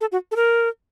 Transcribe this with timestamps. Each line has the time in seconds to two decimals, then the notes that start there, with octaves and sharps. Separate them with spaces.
0.01 A4
0.12 F#4
0.31 A4
0.36 A#4